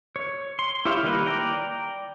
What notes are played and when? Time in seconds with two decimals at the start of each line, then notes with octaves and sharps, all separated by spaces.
0.16 C#5
0.59 C6
0.85 E4 G4 C#5 E5 F5
1.03 D#3 G3 A#3 D#4 B4
1.26 D5 G5 A#5